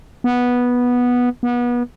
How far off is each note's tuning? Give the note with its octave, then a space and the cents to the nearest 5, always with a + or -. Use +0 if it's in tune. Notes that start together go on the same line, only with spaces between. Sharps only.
B3 -10
B3 -30